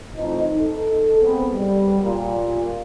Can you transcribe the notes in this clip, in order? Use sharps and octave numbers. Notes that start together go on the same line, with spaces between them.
F2 E3 A3 D#4
A4
G#2 B3 C4
G3
A#2